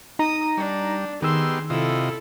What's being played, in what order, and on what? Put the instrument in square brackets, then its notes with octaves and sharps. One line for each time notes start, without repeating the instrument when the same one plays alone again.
[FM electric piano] D#4 A#5 A#6 [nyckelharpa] D#6
[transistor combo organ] G3 [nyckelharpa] D4
[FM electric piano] D#3 E6 [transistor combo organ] B3 D#4 G4 [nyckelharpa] G#4 C6
[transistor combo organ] C3 F4 D#5 [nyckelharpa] E4 A4